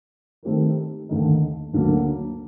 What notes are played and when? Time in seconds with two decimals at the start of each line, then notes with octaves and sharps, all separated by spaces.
0.43 D#3 A3 C4 G4 A#4
1.09 D#2 D3 A3 D#4
1.73 D2 D3 F#3 A#3